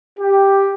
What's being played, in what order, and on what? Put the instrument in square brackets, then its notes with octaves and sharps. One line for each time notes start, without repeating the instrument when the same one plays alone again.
[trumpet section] G4